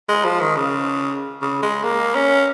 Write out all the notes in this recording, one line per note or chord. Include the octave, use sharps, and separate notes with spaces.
G#3
F3
D#3
C#3
C#3
G#3
A#3
C#4